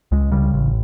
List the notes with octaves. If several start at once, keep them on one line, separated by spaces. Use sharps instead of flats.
C#2 G#3
C#3 G3
A1